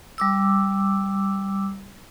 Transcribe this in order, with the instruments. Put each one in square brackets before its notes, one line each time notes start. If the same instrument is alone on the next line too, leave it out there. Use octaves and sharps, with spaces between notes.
[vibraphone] G3 D6 E6